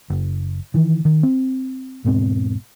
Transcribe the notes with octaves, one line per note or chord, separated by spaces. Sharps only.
F#1
D#3 E3
D#3
C4
E1 G#2 B2 C4